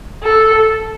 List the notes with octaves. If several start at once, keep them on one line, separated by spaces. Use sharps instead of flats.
A4